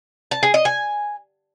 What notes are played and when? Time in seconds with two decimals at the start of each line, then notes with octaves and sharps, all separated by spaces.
0.31 A5
0.43 G#4
0.54 D#5
0.65 G#5